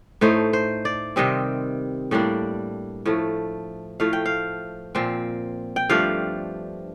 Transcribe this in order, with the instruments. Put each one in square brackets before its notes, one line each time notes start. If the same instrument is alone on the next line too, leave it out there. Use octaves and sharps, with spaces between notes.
[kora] A2 A3 D#4 C5
C5
D5
C3 D#3 G3 C4 D#5
A2 G3 A#3 D4
A2 F3 A3
A2 F3 A3 F5
G5
F5
A#2 F3 C4
G5
G2 F3 A3 D4 F5